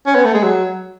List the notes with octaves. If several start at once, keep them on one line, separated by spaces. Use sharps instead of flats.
C#4
B3
A3
G#3
F#3